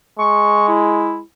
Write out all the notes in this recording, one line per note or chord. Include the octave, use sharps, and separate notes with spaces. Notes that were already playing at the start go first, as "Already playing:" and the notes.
G#3 C#6
E4